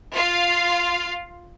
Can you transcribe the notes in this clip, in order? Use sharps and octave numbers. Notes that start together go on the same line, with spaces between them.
F4 F5